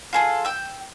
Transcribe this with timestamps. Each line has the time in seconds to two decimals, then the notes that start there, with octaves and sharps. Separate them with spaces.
0.13 F4 G#4 A4
0.45 G5 E6